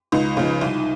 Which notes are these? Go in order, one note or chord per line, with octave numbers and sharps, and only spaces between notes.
C#2 D#4
C#3 F3
C2